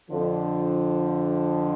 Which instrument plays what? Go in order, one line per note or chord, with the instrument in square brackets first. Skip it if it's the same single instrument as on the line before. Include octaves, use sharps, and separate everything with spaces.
[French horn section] F2 D3 F3